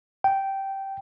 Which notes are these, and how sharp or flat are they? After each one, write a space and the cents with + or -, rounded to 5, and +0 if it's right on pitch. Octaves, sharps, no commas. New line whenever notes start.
G5 -10